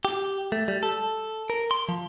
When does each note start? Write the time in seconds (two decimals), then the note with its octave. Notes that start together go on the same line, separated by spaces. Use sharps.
0.05 G4
0.52 A3
0.68 G3
0.83 A4
1.50 A#4
1.71 C6
1.89 F3